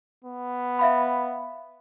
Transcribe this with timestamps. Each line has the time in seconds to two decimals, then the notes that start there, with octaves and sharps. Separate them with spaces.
0.25 B3
0.79 E5 F5 B5